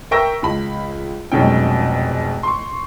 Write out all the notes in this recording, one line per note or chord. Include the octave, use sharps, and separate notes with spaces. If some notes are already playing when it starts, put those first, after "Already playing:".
A#4 E5 G5 C#6 E6 A#6
C#2 B5
F1 G#2 B2 F#3 C#4 G5
C6 C#6